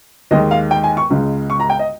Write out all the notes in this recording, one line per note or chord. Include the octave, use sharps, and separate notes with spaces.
D#2 D#3 G#3 D#5
F5
G5
G#5
C#6
C#2 C#3 G#3
C#6
A#5
G5
D#5